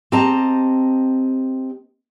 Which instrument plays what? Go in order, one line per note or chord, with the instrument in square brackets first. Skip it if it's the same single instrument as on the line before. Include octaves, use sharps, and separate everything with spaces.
[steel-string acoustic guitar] C4 G4 D#5 A5 A#5